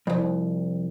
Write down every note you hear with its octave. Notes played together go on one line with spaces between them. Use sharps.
C2 F2